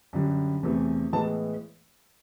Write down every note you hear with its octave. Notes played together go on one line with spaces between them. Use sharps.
F#2 D3 G3
E2 C3 E3 A3
A2 E3 G#3 B3 A5